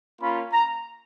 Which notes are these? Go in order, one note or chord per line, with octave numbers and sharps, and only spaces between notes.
A#3 C#4 F4 B5
A#5